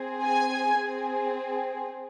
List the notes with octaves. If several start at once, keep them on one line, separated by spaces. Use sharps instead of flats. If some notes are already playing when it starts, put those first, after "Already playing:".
Already playing: C4 G#4
G#5
C4 G#4